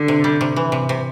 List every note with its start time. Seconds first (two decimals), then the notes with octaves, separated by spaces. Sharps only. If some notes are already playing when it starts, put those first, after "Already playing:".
Already playing: D3
0.08 C3
0.24 G3
0.41 C3
0.56 E3
0.72 C3
0.89 C3